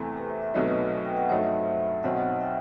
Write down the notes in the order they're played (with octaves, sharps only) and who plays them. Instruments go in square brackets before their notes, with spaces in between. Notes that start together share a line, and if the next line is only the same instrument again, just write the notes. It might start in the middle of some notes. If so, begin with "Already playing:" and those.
Already playing: [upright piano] E2 C3 E3 A3 [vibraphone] A4 C5
[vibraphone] G4 B4
C5 E5
C5 E5
[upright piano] C2 B2 F#3 A3 D#4 [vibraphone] B4 D#5
[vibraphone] G5
F#5
[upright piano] G2 F#3 A3 D#4 [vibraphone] C5 E5
[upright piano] B1 B2 F#3 C4 D#4 [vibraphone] D#5 F#5
[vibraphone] E5 G5